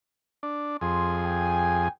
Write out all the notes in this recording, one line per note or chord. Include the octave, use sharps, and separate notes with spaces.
D4
F2 G#4 C6
G5 G#5